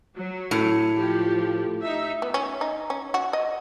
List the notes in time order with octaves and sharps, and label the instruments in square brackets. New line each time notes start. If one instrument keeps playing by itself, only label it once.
[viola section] F#3
[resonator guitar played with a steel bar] A2
[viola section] F3 G4
D#4 E5
[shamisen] B3
C#4
D#4
C#4
F#4
D#5